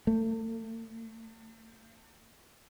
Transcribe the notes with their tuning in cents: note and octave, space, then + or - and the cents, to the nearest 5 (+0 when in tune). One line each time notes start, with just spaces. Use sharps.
A3 +40